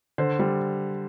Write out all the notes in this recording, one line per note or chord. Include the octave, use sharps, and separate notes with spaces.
D3 C5
G3